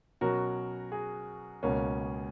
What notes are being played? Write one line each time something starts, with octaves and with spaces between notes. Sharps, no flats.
B2 F#3 C#4 F#4 A#4
G#4
C#2 B2 A#3 C#4